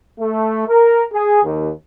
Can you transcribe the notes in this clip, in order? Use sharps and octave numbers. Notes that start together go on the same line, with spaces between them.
A3
A#4
G#4
D#2